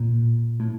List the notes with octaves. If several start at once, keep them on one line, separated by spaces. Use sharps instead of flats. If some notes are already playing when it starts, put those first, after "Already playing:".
Already playing: A#2
A2